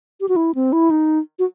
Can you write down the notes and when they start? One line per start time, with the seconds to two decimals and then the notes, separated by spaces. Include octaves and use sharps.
0.21 G4
0.29 F#4
0.36 E4
0.55 C4
0.73 E4
0.90 D#4
1.39 F#4